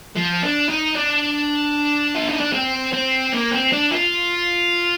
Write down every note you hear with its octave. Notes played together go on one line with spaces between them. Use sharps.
F3
D4
D#4
D4
F4
D#4
D4
C4
C4
A#3
C4
D4
F4